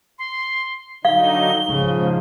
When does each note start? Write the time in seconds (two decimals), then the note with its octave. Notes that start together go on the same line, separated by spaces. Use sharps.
0.19 C6
1.05 D3 F#3 D#4 F5 G7
1.70 G#2 C#3 F3